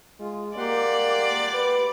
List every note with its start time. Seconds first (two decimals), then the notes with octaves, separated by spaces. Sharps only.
0.20 G#3 F4
0.57 A#3 G4 D5 F#5 C6
1.54 B4